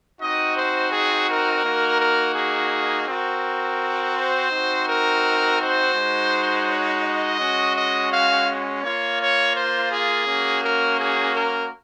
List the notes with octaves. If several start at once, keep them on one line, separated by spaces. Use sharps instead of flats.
C4 D#4 F#4 D#5
C5
G#4
A#4
A#3 D#4 F#4
A#4
G#4
C4 F#4 A#4
C5
C4 D#4 F#4
A#4
C5
G#3 D#4 F#4
C#5
D#5
G#3 C#4 F#4
D#5
F5
A#3 F4 C#5
C#5
C5
G#4
A#3 C#4 F#4
A#4
G#4
A#4